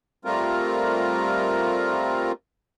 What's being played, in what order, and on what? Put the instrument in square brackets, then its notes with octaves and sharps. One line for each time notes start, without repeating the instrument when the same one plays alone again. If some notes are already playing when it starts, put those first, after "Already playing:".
[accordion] G3 A3 C4 F4 A#4